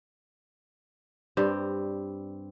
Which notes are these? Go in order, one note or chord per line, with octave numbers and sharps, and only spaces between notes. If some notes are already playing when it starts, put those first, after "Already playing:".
G2 G3 C4